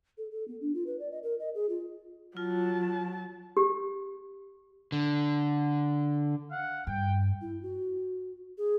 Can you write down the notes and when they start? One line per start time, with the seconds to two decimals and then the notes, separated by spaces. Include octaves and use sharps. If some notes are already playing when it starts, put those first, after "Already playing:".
0.18 A4
0.31 A4
0.48 B3
0.61 D4
0.74 F4
0.87 B4
0.99 D5
1.11 D#5
1.23 A#4
1.40 D#5
1.55 G#4
1.69 F4
2.37 F#3 F4 A5
3.57 G4
4.92 D3
6.51 F5 F#5
6.87 G2 G5
7.41 E4
7.62 F#4
8.58 G#4